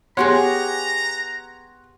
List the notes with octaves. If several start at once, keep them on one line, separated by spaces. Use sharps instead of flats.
B3 G4 G#4 C#5 F#5 A#5 C6